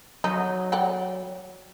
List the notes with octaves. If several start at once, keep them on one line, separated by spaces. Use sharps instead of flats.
F#3 D#4
D5 F#5 G5